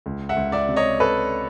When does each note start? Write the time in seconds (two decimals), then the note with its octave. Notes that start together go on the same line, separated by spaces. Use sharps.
0.06 C#2
0.29 E5 F#5
0.37 C#2
0.52 D5 E5
0.69 C3
0.76 C#5 D#5
1.00 A4 B4